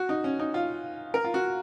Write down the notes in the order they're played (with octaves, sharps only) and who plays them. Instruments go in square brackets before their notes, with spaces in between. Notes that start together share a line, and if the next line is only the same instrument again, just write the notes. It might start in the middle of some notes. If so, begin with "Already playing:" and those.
Already playing: [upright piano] F#4
D#4
C#4
D#4
F4
A#4
F4
F#4